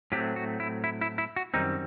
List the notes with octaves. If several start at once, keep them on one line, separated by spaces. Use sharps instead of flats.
A2 F#3 A3 C4 G4
F#4
E4
E4
E4
E4
F#4
F#2 D#3 G3 C4 D#4